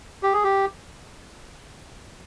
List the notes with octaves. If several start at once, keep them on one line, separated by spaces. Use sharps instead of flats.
G4
G#4
G4